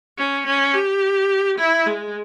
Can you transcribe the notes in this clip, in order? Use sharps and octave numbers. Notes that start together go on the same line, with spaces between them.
C#4
C#4
G4
E4
G#3